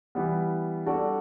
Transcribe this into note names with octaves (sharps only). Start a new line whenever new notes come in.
E3 G3 B3
G3 D4 F#4 A4 D5